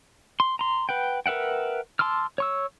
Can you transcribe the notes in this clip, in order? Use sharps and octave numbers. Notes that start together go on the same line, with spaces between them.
C6
A#5 C6
B4 F#5 G5
A#4 B4 E5 F#5 G5
A5 C6 D6 E6 F6
C#5 C#6 E6